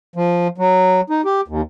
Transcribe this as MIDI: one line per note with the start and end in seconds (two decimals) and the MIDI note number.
0.16 0.48 53
0.58 1.01 54
1.10 1.21 63
1.25 1.41 67
1.48 1.61 39